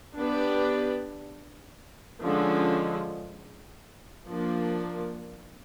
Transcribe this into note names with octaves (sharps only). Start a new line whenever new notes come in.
B3 D4 G4 B4 D5
D3 F3 G#3 C#4
F3 A#3 D4